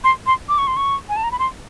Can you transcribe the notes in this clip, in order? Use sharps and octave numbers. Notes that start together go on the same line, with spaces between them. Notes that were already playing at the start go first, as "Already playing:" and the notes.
C6
C6
D6
C#6
C6
C#6
G#5
A5
A#5
B5
C6